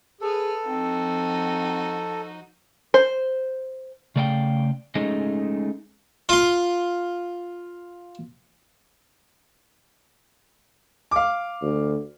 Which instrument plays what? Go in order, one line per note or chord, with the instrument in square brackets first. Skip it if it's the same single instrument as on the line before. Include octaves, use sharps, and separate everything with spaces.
[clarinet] G#4 [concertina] A4 [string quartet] B4 F6
[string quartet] F3 D#4 F#4 [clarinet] C4
[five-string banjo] C5
[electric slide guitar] C#3 A3 D5 F5 G5
G#3 A3 C#4 D#4 G#4 D#5
[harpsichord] F4 C6
[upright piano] F5 D6
[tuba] D2